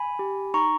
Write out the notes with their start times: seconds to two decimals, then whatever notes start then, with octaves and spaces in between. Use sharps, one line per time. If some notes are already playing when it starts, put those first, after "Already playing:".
Already playing: G#5 B5
0.19 G4
0.54 D#4 A#5 C#6